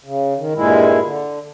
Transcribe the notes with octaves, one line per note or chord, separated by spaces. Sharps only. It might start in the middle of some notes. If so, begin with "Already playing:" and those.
C#3
D#3
G2 A#2 G#3 E4
D3